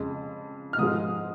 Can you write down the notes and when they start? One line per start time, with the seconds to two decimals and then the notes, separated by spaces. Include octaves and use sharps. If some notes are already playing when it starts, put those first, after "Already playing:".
Already playing: F2 C#3 G#3
0.73 F6
0.78 G#2 F3 G#3 D#6